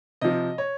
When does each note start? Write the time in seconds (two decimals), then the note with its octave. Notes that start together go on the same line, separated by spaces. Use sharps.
0.21 C3 F3 D#5
0.58 C#5